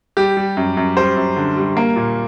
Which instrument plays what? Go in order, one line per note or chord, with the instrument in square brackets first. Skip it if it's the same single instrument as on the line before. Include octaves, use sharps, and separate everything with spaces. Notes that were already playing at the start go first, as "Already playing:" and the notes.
[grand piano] G3 G4
G3
F#2
F#2
G3 C5
F#2
D3
G3
A#3
A#2